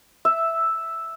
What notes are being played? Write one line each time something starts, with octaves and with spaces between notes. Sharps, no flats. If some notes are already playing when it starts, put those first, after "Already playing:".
E5